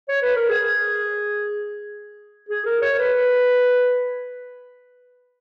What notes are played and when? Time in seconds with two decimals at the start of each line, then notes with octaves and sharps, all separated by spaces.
0.08 C#5
0.22 B4
0.36 A#4
0.49 G#4
2.49 G#4
2.66 A#4
2.82 C#5
2.99 B4